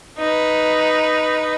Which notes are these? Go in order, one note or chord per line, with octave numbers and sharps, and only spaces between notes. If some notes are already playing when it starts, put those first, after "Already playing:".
D#4 B4